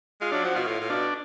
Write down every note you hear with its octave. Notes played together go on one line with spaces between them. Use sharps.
G#3 F4
F#3 D4
F3 F#4
B2 F4
A2 F4
A2
B2 D4